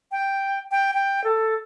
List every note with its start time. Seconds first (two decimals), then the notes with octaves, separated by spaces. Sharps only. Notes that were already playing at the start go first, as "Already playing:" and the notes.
0.12 G5
0.71 G5
0.94 G5
1.24 A4